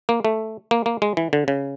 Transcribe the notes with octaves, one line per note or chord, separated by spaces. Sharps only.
A#3
A3
A#3
A#3
G#3
E3
D3
C#3